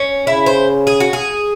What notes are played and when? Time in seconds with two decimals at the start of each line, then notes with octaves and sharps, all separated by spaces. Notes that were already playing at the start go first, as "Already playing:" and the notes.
Already playing: C#4
0.27 C#3 E4
0.46 C5
0.87 G#4
1.00 F#4
1.13 G#4